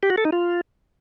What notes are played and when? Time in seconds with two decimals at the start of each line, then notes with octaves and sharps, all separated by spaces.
0.03 G4
0.10 F#4
0.18 A4
0.25 D#4
0.32 F4